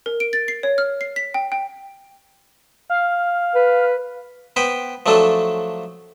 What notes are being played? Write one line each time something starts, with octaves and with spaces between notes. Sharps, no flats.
A#4
D7
A6
C7
C#5
F6
C7
B6
G5
G5
F5
B4
B3 B4 C5 G5
F3 F#3 A3 D4 A4